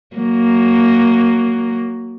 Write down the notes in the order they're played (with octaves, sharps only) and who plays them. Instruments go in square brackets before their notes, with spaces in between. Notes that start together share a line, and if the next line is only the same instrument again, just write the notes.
[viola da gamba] F#3 A#3